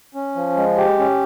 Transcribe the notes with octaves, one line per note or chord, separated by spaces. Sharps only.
C#4
F3
G#3
G4
C#4